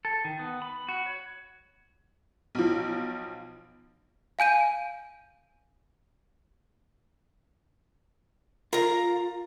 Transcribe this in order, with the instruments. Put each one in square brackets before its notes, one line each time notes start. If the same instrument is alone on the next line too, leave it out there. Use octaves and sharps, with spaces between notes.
[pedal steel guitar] A4
D#3
B3
B5
F#4
C#5
[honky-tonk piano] B1 F3
[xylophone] F5 G#5 G6 D#7
[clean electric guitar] F4 [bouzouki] A#4 A#5